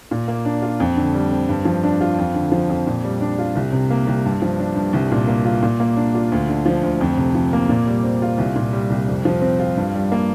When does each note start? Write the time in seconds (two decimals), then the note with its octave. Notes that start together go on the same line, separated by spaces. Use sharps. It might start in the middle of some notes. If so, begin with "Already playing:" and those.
0.11 A#2
0.28 A#3
0.45 D4
0.62 F4
0.80 F2
0.96 D3
1.14 G3
1.32 C4
1.49 G2
1.65 F3
1.83 D4
2.01 F4
2.18 F2
2.35 D3
2.52 F3
2.69 F2
2.87 A#2
3.04 G3
3.21 D4
3.38 F4
3.55 C2
3.72 C3
3.90 A#3
4.07 C2
4.25 G2
4.42 F3
4.59 D4
4.76 G2
4.93 C2
5.11 A#2
5.28 A#3
5.45 F4
5.62 A#2
5.80 A#3
5.97 D4
6.14 F4
6.32 D2
6.49 D3
6.66 F3
6.83 D2
7.01 F2
7.17 C3
7.35 F3
7.53 A#3
7.69 A#2
7.87 G3
8.04 C4
8.22 F4
8.38 C2
8.56 A#2
8.73 G3
8.90 C2
9.08 F2
9.25 F3
9.42 C4
9.60 F4
9.77 G2
9.94 G3
10.12 A#3